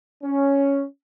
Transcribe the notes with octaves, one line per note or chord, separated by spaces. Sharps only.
C#4